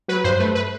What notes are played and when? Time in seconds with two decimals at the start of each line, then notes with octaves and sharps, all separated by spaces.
0.08 F#3 B4
0.24 G2 C5
0.39 A3 B4
0.55 B4